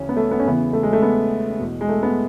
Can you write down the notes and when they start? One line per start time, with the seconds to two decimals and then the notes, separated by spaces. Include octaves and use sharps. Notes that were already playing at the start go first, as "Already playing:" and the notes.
Already playing: D2 C#3 E3 C#4
0.09 B3
0.17 A3
0.31 B3
0.40 C#4
0.45 E2 C#3 E3 B3
0.73 A3
0.83 G#3
0.93 A3
1.02 B3
1.59 E2 B2
1.81 G#3
1.89 A3
2.03 B3